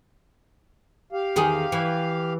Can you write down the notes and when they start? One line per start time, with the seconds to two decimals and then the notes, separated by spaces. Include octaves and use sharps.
1.13 G4 F5
1.36 E2 D#3 G#4
1.72 E3